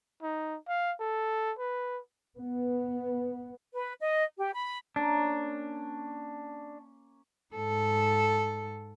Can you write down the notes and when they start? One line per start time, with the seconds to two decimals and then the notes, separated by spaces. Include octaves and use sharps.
0.22 D#4
0.68 F5
1.00 A4
1.59 B4
2.36 B3
3.74 B4
4.01 D#5
4.38 G4
4.54 B5
4.96 A#3 C#4 D4
7.54 G#2 A4